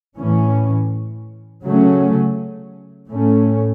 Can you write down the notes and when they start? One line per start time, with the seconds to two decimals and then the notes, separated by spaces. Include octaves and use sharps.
0.16 A2 E3 C#4
1.63 C#3 F#3 A3 C#4
3.08 A2 A3 C#4